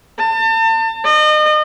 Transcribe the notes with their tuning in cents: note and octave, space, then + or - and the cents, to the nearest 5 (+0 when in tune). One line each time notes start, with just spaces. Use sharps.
A5 +35
D#5 -35